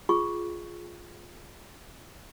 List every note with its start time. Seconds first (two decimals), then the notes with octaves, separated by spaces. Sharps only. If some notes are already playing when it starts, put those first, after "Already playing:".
0.09 F4 G#4 C#6